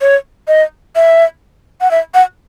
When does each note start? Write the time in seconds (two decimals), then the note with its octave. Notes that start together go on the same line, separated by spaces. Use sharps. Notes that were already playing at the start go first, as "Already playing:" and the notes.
0.01 C#5
0.48 D#5
0.96 E5
1.81 F#5
1.91 E5
2.14 F#5